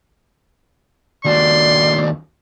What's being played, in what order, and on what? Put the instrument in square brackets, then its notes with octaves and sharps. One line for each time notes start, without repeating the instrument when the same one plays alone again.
[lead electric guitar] D#2 F#4 [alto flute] D5 [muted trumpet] C6